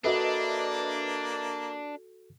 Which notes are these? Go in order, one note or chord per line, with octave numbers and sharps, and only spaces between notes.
A#3 D4 F#4 A4 B4 D#5 E5